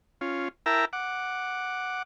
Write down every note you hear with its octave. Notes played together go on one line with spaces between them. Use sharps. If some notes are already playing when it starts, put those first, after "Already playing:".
C#4 F4
E4 A#4 E5 G5 A5 A#5
F#5 D6